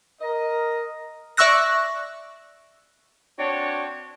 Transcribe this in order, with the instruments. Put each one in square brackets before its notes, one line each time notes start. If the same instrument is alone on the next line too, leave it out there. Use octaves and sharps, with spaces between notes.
[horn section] A#4 D#5
[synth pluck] D5 E5 C#6 E6 F#6 A#6
[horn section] C4 D4 F#4 C#5